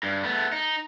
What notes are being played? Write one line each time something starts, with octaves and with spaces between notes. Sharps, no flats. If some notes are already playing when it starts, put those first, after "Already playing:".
G2
A3 B3
D#4